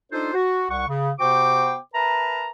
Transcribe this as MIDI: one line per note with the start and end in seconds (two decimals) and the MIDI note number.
0.12 0.32 62
0.12 0.32 63
0.12 0.32 65
0.12 0.32 69
0.12 0.32 72
0.34 0.67 66
0.71 0.87 36
0.71 0.87 78
0.71 0.87 85
0.88 1.10 49
1.20 1.77 48
1.20 1.77 59
1.20 1.77 66
1.20 1.77 72
1.20 1.77 79
1.20 1.77 86
1.94 2.49 70
1.94 2.49 71
1.94 2.49 76
1.94 2.49 81
1.94 2.49 82